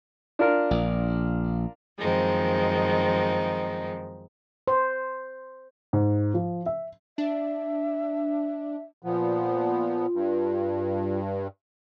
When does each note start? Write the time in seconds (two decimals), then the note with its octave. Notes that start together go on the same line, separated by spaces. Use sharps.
0.39 D4 F4 A#4
0.71 A#1
1.98 F#2 D#3 F3 G#3 C4 D#4
4.68 C5
5.93 G#2
6.34 F3
6.66 E5
7.18 D4 E5
9.03 A#2 F3 B3 F4
10.14 G2